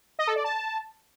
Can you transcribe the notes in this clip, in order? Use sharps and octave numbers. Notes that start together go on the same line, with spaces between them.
D#5
A4
D5
A5